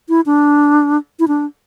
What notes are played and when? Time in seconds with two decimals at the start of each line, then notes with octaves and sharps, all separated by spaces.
0.09 E4
0.26 D4
1.19 E4
1.28 D4